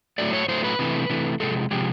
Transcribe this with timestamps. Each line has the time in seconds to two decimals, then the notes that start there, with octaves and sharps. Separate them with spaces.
0.18 A2 F#3 A3 D5
0.33 C#5
0.48 A2 F#3 A3 C5
0.64 B4
0.79 C3 E3 A3
1.10 C3 E3 A3
1.40 C3 F3 G#3 A4
1.71 C3 F3 G#3 G4